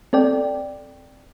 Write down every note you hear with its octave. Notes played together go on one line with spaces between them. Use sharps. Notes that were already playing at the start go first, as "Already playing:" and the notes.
C4 A4 D5 G5